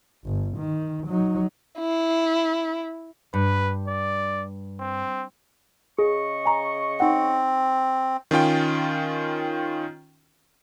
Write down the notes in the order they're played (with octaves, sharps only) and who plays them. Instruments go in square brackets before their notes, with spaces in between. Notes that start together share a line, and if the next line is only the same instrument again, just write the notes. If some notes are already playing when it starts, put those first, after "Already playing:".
[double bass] G1
D#3
F#3 D#4
[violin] E4
[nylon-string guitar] G2 [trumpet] B4
[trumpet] D5
C4
[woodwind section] C#3 D#5 C#6 [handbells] G#4
[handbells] G#5 A#5
[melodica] C4 [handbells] D#4 F#5
[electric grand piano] D#3 C#4 F4 G5